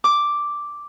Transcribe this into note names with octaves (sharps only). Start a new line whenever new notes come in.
D6